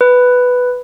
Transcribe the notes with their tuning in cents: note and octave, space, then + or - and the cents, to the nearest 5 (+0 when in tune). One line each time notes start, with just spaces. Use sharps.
B4 +5